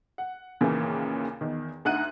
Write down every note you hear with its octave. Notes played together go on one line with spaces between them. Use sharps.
F#5
D#2 A#2 C#3 E3 A#3
E2 D#3
D2 D#4 F#5 F#6 D#7